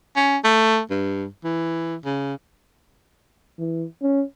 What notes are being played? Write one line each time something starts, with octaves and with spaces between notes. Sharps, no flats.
C#4
A3
G2
E3
C#3
E3
C#4